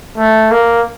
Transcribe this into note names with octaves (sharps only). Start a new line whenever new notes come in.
A3
A#3